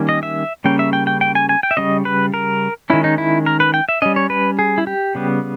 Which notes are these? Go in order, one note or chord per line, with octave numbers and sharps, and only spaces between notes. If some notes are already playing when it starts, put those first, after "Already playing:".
Already playing: D#3 G3 A#3 C#4
D#5
E5
C#3 G3 A#3 C#4 G5
E5
G5
G5
G5
G#5
G#5
G5
E5
C#3 G3 C#4 D#5
B4
A#4
D#3 G#3 C#4 E4
D#4
E4
A#4
B4
G5
E5
G3 C#4 D#5
C#5
B4
G#4
E4
G4
C#3 G3 B3